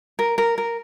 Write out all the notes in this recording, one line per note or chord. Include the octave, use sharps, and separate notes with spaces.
A#4
A#4
A#4